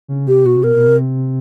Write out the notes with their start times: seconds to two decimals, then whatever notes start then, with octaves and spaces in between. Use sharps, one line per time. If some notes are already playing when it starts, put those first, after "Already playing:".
0.08 C#3
0.27 C3 G4
0.45 B2 F#4
0.56 C3
0.64 B2 A#4
0.76 B2
0.87 C3